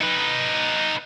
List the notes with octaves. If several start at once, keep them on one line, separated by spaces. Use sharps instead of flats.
D#4 B4